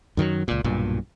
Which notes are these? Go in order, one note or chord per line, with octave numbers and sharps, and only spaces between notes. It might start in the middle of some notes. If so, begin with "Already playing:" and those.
F#2 D#3 F3 F#3
C#2 A#2
B1 G2 A#2